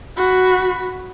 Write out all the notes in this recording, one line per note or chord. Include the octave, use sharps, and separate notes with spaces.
F#4 B5